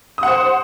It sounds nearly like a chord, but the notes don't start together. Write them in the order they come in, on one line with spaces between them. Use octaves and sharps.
D#6 F#5 C5